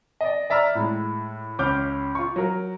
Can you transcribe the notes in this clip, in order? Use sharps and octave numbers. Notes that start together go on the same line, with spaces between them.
D5 D#5
D5 E5 A#5 F6
A2 G#3
C#2 C#4 D6 F6 G6
F4 C#6
F#3 A#4